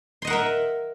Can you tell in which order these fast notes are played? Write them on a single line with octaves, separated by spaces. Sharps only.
C6 D#5 F#5 A#4 E5